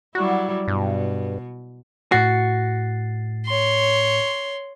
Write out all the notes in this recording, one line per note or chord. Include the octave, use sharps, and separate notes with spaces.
F#3 G3 E4 F#4
G2 B2
A2 F#4 A6 C7
C#5 C6